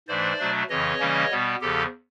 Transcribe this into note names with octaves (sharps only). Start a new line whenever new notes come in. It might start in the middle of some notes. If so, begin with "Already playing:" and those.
G#2 E3 A3 D4 C5 D5
B2 F#3 A3 D4
F2 C#3 E3 C#5 D#5
C#3 E3 G3 A#3 C#4
B2 G3 B3
E2 C#3 F3 G4 A4